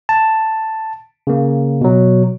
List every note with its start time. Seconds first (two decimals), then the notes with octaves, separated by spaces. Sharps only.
0.09 A5
1.27 C#3 A#3
1.81 B2 F#3